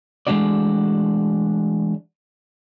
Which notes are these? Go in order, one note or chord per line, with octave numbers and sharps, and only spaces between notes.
E3 G#3 A3 D4 F#4 D5